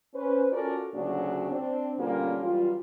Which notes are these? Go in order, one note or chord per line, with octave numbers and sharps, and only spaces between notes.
C#4 B4 C5
C#4 F4 F#4 A4 A#4 D5
D2 A#2 C#3 F#3 D4 F#4
C4 D4
B2 D3 G3 A#3 C#4 F4
F#2 E3 G3 F4